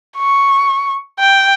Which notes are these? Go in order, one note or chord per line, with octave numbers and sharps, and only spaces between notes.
C#6
G5